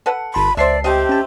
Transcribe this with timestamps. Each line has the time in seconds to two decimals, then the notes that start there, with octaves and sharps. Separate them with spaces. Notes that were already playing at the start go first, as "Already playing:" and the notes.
0.06 A4 B4 F#5
0.34 G1 A5 B5 C6
0.57 C#2 C5 D5 E5 A5 C7
0.84 A3 C4 G4 D#5
1.09 C#4 A5